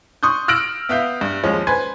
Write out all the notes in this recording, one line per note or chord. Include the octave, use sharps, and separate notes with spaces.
C6 C#6 D#6 F#6 G6
E6 F6 A#6 D7 F#7
B3 E5 F5 G6
G2
D#2 F3 G#3 C#4
B4 C5 G#5 C6 G#6